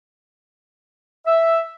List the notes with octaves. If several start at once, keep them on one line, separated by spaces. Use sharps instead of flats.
E5